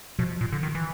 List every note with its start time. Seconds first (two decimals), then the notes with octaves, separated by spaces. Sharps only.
0.19 B2 F3
0.41 A#2
0.53 D3
0.63 D#3
0.75 E3